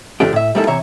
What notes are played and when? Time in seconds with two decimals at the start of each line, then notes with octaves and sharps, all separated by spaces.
0.20 G2 D3 F3 A3 D4 G4
0.33 A2 E5
0.55 G3 G#3 A#3 D#4 E4 A4
0.67 C3 E3 C#5 E5 A#5